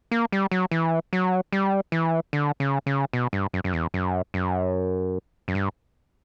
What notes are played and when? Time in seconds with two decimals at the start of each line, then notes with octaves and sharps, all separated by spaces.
0.11 A#3
0.32 G3
0.51 F#3
0.71 E3
1.13 F#3
1.52 G3
1.92 E3
2.33 D3
2.60 C#3
2.86 C#3
3.13 B2
3.33 G2
3.53 F#2
3.64 F#2
3.73 E2
3.94 F#2
4.34 F#2
5.48 F#2
5.55 G2